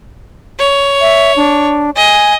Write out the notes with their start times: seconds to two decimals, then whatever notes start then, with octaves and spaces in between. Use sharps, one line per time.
0.59 C#5
1.01 E5
1.36 D4
1.96 D#5 G#5